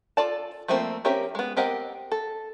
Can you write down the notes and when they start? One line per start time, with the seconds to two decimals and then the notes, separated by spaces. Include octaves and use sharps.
0.17 F4 A4 D5 A5
0.68 F3 A3 A#3 C4
1.05 C4 C#4 G4 A#4 E5
1.35 G#3 B3
1.57 C4 G4 A#4 D#5 F#5
2.12 A4